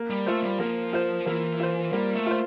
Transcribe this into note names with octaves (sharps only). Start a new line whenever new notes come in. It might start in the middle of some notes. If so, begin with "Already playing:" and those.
Already playing: A#3
G3
A3 F4 C5
G3
F3 A#3
F4 C5
E3 A#3
F4 C5
G3 A#3
A3
F4 C5